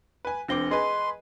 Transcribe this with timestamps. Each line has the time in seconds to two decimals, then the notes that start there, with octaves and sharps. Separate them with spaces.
0.25 B4 G#5
0.48 F1 C4 D4 D6 A#6 G7
0.71 G#4 B4 D#5 C6